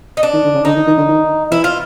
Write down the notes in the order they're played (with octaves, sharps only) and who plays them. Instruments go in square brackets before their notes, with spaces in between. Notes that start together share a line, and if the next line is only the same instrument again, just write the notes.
[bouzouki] D#4
D4
[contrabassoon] D#3
D3
C#3
[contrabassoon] D3 [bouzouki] D#4
[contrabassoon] D#3
D#3
D3
D#3
[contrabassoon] E3 [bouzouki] E4
[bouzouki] F4